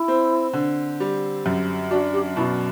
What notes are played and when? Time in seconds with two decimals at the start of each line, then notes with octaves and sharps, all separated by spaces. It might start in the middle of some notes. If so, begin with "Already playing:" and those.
Already playing: E4
0.08 C4
0.53 D3
1.00 G3
1.46 F#2
1.91 D4 F#4
2.13 G4
2.36 B2 E4